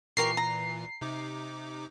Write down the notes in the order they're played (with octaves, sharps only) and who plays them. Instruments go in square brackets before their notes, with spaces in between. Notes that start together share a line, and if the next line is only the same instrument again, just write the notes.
[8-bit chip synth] A#2 E3 [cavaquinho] G4 A#4 C#6 [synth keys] C7
[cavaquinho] A#5
[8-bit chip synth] C3 D#4 D6